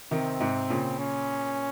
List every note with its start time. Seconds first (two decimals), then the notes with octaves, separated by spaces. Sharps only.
0.11 C3 D#3 C4
0.40 G#2 C3
0.70 A#2 C#3
0.99 C#4